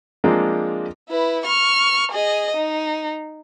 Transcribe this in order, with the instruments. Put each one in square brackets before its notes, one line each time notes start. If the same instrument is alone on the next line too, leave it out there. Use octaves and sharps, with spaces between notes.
[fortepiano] F3 G#3 A#3 C4 D4 F4
[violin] E4 B4
C#6 F6
G#4 D#5
D#4